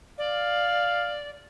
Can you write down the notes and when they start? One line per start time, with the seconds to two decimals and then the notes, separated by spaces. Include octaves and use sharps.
0.18 D5 F5